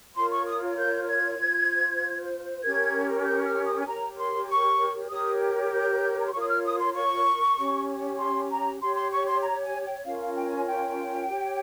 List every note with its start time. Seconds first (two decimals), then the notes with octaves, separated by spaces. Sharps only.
0.16 F4 A#4 C#5 C6
0.31 C#6
0.46 D#6
0.78 G6
1.08 G#6
1.38 F4 C5
2.62 C#4 G4 A#4 G#6
3.25 G6
3.46 F6
3.66 D#6
3.81 G#5
3.86 G4 A#4 C#5 A#5
4.17 C6
4.49 C#6
5.10 G4 A#4 C#5 D#6
5.72 G6
6.18 A#5
6.26 C6
6.33 F4 A#4 C#5 C#6
6.41 D#6
6.49 F6
6.65 D#6
6.80 C6
6.95 C#6
7.57 C#4 G4 C#5
8.19 C6
8.50 A#5
8.81 G4 C#5 C6
8.96 C6
9.12 C#6
9.27 C6
9.42 A#5
9.63 G#5
9.84 G5
10.04 C#4 F4 A#4 C#5 F5
10.20 F5
10.35 G5
10.50 G#5
10.67 G5
11.27 G4 C#5